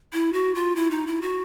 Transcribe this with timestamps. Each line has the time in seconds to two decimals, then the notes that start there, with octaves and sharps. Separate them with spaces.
0.13 E4
0.33 F#4
0.55 F4
0.76 E4
0.91 D#4
1.07 E4
1.22 F#4